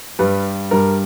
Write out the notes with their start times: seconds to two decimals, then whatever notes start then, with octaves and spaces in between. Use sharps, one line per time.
0.19 G2 G3 B4
0.71 G2 G3 A#4